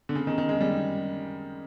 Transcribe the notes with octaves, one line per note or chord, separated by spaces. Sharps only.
D3
C#3
D#3
D#3
G#3
G3